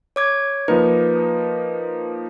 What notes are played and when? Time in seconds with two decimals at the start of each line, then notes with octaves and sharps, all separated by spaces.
0.16 C#5 D6 G#6
0.68 F3 A#3 D#4 B4